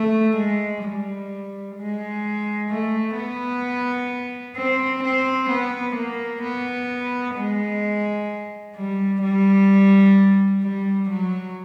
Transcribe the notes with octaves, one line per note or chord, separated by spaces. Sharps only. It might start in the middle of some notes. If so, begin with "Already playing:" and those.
Already playing: A3
G#3
G3
G#3
A3
B3
C4
C4
B3
A#3
B3
G#3
G3
G3
G3
F#3